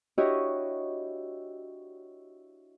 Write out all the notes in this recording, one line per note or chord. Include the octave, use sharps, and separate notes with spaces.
D4 E4 F#4 G4 C#5 D#5